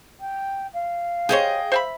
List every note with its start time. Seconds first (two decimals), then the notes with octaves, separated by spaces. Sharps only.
0.19 G5
0.73 F5
1.29 G4 G#4 C5 C#5 D#5 G5
1.72 C5 E5 B5